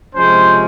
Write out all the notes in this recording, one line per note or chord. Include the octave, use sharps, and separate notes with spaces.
C3 F3 G#3 C#4 C5